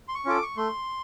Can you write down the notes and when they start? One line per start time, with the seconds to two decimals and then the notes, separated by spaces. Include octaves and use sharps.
0.08 C6
0.15 C#6
0.25 C#4 F4 A4 D6
0.43 C#6
0.57 A3 C6